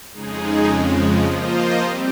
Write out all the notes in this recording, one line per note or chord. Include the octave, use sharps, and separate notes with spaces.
F2 C#3 G#3 D#4 G#4
F2 C#3 F3 G#3
F3 A#3 F4 C5 D#5
G3 C4 G4